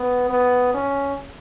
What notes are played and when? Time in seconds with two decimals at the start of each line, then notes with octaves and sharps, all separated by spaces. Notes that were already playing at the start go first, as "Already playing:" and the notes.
Already playing: B3
0.30 B3
0.74 C#4